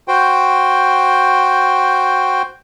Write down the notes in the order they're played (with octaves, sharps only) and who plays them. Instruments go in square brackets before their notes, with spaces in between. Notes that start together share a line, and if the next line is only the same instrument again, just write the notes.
[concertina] F#4 C5 G5